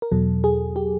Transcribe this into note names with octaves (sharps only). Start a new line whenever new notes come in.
A#4
E2 B2 F#3 A4
G#4
G4